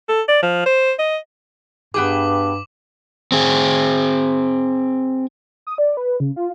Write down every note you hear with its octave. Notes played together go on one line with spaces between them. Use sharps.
A4
D5
F3
C5
D#5
G2 B3 G4 G#4 D6 F#7
C4 G#4
D#6
D5
B4
C#3
F4